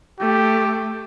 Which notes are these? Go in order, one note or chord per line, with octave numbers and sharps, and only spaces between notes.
A3 G4